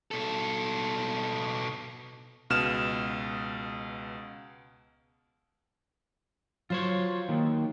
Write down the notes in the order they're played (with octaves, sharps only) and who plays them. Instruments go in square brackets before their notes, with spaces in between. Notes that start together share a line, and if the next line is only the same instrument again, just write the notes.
[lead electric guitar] B2 A4
[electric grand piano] C#2 B2 F6 E7
[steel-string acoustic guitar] F#3 [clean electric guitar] F4 C5 C#5
[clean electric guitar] D#3 A#3